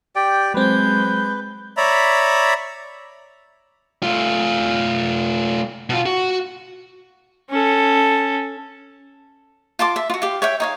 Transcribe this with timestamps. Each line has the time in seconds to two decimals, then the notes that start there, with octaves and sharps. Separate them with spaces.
0.16 G4 D5 G5
0.54 F#3 G#3 C4 B4 G6
1.77 C#5 D5 E5 A#5 B5
4.03 A3 F4
5.90 B2 F4
6.06 F#4
7.50 C#4 A4
9.79 F4 A5 C6 D6
9.96 E5
10.10 F4 F#4
10.22 G4 F5
10.42 C#5 E5 G5
10.60 D#4 C#5 F5